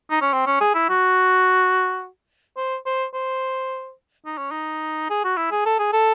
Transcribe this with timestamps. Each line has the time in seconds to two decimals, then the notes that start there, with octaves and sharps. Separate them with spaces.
0.11 D#4
0.22 C#4
0.33 C4
0.47 C#4
0.60 G#4
0.75 E4
0.89 F#4
2.57 C5
2.86 C5
3.14 C5
4.25 D#4
4.38 C#4
4.51 D#4
5.10 G#4
5.24 F#4
5.37 E4
5.51 G#4
5.66 A4
5.79 G#4
5.93 A4